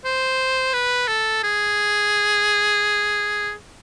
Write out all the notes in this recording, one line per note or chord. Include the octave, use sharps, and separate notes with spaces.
C5
B4
A4
G#4